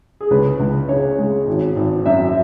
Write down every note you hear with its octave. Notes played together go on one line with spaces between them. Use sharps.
G#4
C#2 B4
C#2
C#3 C#5
G#3
G#1
G#1
F#2 E5